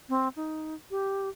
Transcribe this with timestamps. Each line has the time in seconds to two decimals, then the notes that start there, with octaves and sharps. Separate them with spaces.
0.09 C4
0.36 D#4
0.91 G4